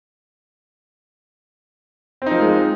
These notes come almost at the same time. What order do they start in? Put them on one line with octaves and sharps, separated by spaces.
C4 D#4 F3 A#4 G#3